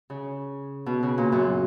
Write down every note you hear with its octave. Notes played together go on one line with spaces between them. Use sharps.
C#3
B2
C#3
A#2
F#2